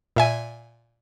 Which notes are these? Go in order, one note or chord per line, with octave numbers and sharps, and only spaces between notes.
A#2 E5 G#5